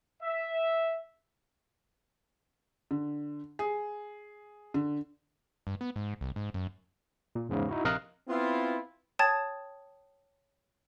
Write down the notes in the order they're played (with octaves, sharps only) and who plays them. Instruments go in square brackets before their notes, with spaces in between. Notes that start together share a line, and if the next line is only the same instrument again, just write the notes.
[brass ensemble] E5
[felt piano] D3
G#4
D3
[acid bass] G2
B3
G#2
C2
G#2
F#2
[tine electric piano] A#2
E2 G#2 C#3
D#4 E4 F#4
A#1 C3 A#4 D#5 F5 F#6
[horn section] B3 C4 E4 F4
[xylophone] C#5 G5 A5 D#6 G#6 A6